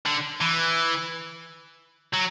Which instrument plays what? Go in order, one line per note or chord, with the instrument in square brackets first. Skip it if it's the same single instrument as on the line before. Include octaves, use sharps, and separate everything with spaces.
[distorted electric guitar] D3
E3
F#3